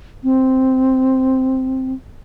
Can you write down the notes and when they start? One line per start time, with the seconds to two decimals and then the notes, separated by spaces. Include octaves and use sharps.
0.24 C4